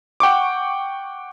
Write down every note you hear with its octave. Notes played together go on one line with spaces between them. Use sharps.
F#5 G5 C#6 D6